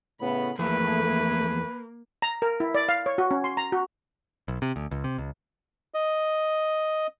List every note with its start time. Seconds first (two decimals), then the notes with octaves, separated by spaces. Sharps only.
0.21 A2 C#3 B3 B5
0.59 E2 F3 A3 A#3 G#4 B4
2.22 A#5
2.42 A#4
2.60 E4
2.75 D5
2.89 F5
3.06 C#5
3.18 F#4
3.31 C#4
3.44 C6
3.57 A#5
3.72 F#4
4.48 B1
4.62 C3
4.76 D2
4.91 C#2
5.04 C3
5.18 C#2
5.94 D#5